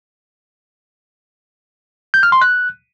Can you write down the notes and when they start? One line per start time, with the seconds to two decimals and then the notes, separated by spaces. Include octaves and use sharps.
2.14 G6
2.23 F6
2.32 C6
2.41 F#6